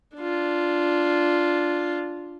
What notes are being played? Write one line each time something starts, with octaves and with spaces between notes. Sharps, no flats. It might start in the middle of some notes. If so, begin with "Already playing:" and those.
D4 F4